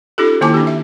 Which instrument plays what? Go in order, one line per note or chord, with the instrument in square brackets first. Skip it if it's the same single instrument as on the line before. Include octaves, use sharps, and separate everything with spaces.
[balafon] C#4 D#4 F4 G4 A4
D#3 A#3 E4 G#5 A5 D6
D4 G4
E5